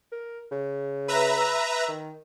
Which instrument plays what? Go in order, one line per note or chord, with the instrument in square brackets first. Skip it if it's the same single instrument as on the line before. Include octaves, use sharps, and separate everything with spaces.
[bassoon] A#4
C#3
[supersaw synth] B4 E5 A#5
[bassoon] D#3